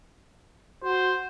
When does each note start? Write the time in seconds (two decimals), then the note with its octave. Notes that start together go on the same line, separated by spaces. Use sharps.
0.84 F#4 C5